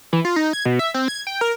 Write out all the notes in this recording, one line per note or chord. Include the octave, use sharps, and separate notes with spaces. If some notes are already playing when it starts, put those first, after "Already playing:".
E3
F4
D#4
G#6
B2
E5
C4
G#6
G5
A#4